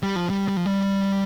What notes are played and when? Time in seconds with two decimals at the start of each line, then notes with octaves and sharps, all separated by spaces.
0.03 G3
0.16 F3
0.30 G3
0.48 G3
0.57 F3
0.66 G3